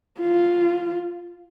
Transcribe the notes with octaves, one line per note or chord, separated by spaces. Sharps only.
F4